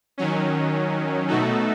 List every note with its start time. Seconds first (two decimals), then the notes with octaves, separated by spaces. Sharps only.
0.18 D#3 F#3 C#4
1.28 B2 A3 D#4 F#4 A4